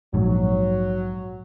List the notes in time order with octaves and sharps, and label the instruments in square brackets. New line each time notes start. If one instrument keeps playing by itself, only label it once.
[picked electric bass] A#1 G#2 [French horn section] F#3